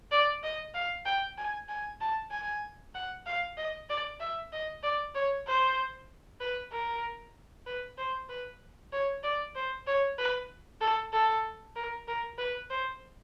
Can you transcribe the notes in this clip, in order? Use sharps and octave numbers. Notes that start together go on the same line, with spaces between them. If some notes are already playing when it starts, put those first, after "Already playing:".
D5
D#5
F5
G5
G#5
G#5
A5
G#5
F#5
F5
D#5
D5
E5
D#5
D5
C#5
C5
B4
A#4
B4
C5
B4
C#5
D5
C5
C#5
B4
A4
A4
A#4
A#4
B4
C5